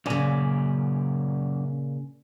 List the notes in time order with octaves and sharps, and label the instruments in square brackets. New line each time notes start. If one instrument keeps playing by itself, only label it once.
[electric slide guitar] F#2 D5 G#5 [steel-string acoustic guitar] A#2 C#3